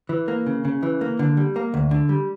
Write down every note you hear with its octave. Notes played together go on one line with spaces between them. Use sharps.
E3
A#3
C#3
C#3
E3
A#3
D3
G3
A#3
D2
D3
G3